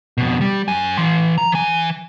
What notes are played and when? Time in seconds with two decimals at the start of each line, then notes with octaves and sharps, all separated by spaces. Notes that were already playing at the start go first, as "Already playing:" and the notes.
0.18 F2 B2
0.41 G3
0.68 F#2 G#5
0.98 E3 C6
1.38 A#5
1.52 E3 G#5